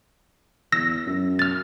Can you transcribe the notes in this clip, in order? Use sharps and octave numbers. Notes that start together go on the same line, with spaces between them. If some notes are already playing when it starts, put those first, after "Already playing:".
E2 E6 A#6
F#2
F6 A6